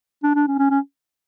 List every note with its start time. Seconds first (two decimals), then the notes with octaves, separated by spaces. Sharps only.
0.23 D4
0.35 D4
0.47 C#4
0.59 C#4
0.71 C#4